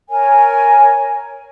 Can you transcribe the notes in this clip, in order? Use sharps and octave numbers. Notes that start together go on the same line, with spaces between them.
A#4 C#5 G#5